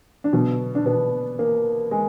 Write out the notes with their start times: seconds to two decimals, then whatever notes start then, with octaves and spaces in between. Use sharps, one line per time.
0.24 D4
0.33 B2 D3 F#3 B3
0.75 D4
0.86 B2 B3
1.39 A#3
1.91 G#3